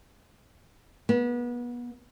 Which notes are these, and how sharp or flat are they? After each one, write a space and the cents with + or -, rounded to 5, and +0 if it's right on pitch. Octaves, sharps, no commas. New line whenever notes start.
B3 -30